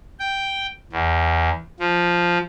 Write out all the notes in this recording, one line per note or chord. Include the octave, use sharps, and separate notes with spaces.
G5
E2
F3